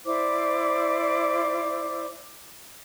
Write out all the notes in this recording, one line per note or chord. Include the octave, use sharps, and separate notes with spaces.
E4 C5 D5 D6